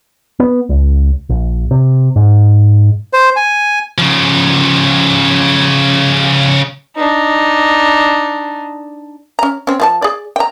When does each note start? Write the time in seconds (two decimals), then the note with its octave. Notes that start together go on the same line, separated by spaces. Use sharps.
0.40 B3
0.69 C#2
1.29 A#1
1.71 C3
2.16 G#2
3.13 C5
3.36 G#5
3.98 C#3 F3
6.96 D4 D#4
9.39 C#4 A#5
9.67 C4 C#4
9.80 F3 C4 A5
10.02 G#4 D5
10.36 G5 A#5